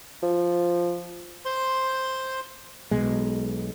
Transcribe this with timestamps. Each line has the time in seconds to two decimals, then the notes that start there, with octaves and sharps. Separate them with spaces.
0.23 F3
1.45 C5 C6
2.91 B1 B2 G#3